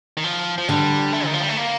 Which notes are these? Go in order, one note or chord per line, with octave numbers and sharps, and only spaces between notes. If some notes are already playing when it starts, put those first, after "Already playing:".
D#3
F3
F3
D3 G3
A3
D#3
F3
G3
A3
A#3